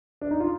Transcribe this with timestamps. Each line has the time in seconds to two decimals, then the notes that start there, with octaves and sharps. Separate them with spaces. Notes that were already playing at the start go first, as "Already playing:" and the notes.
0.21 D4
0.31 D#4
0.40 F4